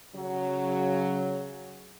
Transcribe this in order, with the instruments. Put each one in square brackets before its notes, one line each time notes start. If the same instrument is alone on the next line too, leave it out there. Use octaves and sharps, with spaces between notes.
[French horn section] C#3 F#3